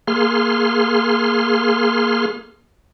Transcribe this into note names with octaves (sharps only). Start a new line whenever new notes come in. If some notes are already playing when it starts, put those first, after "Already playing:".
A#3 G#4 C6 F6